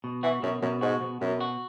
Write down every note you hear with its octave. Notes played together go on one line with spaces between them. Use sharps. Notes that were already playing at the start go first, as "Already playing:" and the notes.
B2
E3 F#4
F#2 B2
F#2 B2
G#2 F#4
B2
F#2 B2
F#4